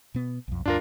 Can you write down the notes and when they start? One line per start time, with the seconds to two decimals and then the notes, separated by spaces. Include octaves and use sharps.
0.14 B2 B3
0.48 B1 F2
0.66 D2 G2 D4 F4 A#4